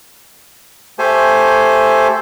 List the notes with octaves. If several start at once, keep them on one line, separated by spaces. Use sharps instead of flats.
A3 G4 A4 C5 G#5